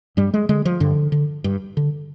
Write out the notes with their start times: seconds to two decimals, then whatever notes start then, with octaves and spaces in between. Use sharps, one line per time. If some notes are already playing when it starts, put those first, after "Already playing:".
0.17 G2 G3
0.34 G#3
0.49 D3 G#3
0.65 F3
0.80 G2 D3
1.12 D3
1.44 G2
1.77 D3